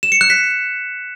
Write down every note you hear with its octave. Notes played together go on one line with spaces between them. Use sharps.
E7
C#7
F#6
B6